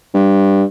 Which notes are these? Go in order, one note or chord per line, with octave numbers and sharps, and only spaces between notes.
G2